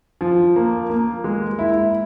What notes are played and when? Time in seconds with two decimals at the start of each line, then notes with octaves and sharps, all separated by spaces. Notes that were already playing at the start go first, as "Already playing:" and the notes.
0.21 F3
0.56 A#3
0.90 A#3
1.24 G#3
1.59 E4